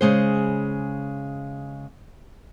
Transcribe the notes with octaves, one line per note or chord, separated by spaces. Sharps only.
C#3 G#3 C5